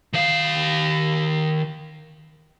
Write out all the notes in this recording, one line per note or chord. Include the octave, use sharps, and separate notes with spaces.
D#3 F5